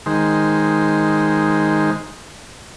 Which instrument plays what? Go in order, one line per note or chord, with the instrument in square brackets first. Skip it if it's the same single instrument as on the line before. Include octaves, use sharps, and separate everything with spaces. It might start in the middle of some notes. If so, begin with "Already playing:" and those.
[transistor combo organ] D#3 G#3 C5